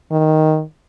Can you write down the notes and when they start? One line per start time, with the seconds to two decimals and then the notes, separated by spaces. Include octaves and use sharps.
0.11 D#3